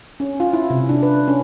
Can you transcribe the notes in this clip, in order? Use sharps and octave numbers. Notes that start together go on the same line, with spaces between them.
C#4
F4
E4
C3
D4
B4
C#4